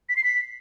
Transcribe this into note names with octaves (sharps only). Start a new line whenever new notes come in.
B6
C7
B6